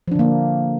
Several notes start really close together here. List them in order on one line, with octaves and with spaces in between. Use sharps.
F3 D4 D3 A#3